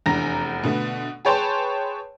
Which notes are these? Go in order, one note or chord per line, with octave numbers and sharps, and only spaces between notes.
F1 E2 D4 A#5 A#6
B2 D3 A3 B3
G#4 B4 C#5 G5 A5 C6